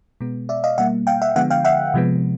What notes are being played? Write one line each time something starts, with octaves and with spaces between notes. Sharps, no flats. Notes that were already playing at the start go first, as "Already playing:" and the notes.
B2 G#3 B3
D5 E5
D#5 F5
B2 G3 A#3 E5 F#5
F5 G5
E5 F#5
D3 F3 G#3 B3 E5 F#5
F5 G5
E5 F#5
C3 F3 G#3 B3